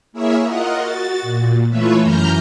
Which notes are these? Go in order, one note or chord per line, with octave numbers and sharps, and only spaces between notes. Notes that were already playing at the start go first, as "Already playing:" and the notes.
A#3 E4 G#4 A#4 C#5 E5
F4 A#4 D#5 F#5
F#4 A6
A#2
E3 A3 F4 B4 C#5 E5
F#2 E3 A#5 F6 G6